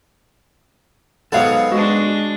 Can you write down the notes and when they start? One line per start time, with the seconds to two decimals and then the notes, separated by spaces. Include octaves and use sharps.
1.32 G#2 F#3 B3 A4 F5 F#5
1.72 G#3 D4 F#4